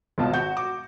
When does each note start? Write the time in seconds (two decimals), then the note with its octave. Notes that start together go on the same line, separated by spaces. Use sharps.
0.18 G#1 E2 B2 F4 A5
0.33 F#4 G6
0.57 D6